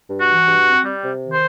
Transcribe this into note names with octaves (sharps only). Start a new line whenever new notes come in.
G2
F#4
E3
G2
C4
G3
C3
D#3
C5